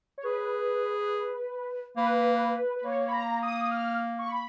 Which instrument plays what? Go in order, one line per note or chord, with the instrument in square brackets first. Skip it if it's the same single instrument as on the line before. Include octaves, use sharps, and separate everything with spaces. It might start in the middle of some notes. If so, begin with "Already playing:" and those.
[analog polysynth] C#5
[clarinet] G#4 [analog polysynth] B4
[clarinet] A#3 [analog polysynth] B4
[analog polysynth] B4
[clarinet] A#3 [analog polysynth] C#5
[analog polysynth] B5
A#5
D#6
F6
C#6
B5